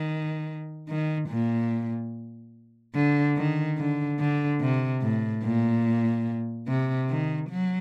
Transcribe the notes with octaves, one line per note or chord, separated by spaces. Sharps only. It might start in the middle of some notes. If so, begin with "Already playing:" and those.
Already playing: D#3
D#3
A#2
D3
D#3
D3
D3
C3
A2
A#2
C3
D#3
F#3